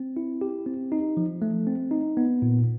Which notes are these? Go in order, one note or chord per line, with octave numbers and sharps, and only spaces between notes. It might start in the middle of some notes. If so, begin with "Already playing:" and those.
Already playing: C4
E4
G4
C4
D#4
F3
A3
C4
D#4
B3
A#2